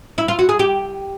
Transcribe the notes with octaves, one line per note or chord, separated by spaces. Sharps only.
E4
F4
F#4
G#4
G4